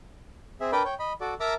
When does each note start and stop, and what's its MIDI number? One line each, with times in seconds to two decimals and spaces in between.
0.60 0.71 60
0.60 0.71 68
0.60 0.71 76
0.72 0.83 62
0.72 0.83 70
0.72 0.83 71
0.72 0.83 74
0.72 0.83 79
0.72 0.83 83
0.85 0.94 73
0.85 0.94 79
0.99 1.13 75
0.99 1.13 83
1.21 1.34 66
1.21 1.34 69
1.21 1.34 74
1.40 1.54 70
1.40 1.54 76
1.40 1.54 81
1.40 1.54 82
1.40 1.54 86
1.40 1.54 88